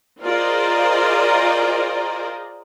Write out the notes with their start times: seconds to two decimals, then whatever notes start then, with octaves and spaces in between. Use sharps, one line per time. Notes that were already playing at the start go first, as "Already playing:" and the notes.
0.22 F4 G#4 A#4 C5 D5 D#5